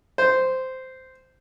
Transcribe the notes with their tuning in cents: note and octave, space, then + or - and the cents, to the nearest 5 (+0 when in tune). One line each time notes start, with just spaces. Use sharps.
C5 -10